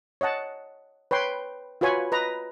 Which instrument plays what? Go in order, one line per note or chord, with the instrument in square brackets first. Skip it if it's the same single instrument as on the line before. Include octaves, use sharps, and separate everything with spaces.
[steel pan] C#5 D#5 F#5 A5
B4 C#5 G5 C6
F4 F#4 B4 C#5 G#5 B5
B4 D#5 A#5